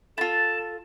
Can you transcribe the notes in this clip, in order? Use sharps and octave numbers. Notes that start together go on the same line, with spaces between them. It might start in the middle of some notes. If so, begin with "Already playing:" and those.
E4 F4 A4 A5